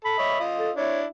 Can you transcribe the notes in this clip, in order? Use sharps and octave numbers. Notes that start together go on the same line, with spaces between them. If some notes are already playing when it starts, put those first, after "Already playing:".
A4 B5
C#5 D#5 E5
F4 D#5
A4
D4 E4 C#5